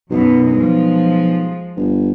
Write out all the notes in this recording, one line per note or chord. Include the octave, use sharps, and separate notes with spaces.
B1 F#2 B2
F3 G#3
G1